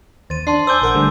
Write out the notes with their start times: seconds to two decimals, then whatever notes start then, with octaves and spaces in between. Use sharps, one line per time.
0.30 D#2 C5 A6 D#7
0.47 D4 A5 C6 C7
0.67 C5 G#5 D6 E6 G6
0.82 A#1 A#4 F#5
0.95 D3 G3 A3